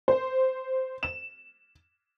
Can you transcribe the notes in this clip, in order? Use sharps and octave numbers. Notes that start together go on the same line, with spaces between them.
C5
E7